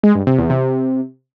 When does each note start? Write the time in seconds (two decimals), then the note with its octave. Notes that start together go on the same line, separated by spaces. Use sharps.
0.03 G#3
0.15 G2
0.27 C3
0.38 E2
0.50 C3